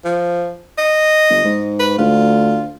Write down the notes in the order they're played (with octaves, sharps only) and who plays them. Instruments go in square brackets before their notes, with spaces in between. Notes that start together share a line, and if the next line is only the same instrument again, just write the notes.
[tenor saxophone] F3
D#5
[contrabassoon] G1
G#2
[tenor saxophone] B4
[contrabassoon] D2 [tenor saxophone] F4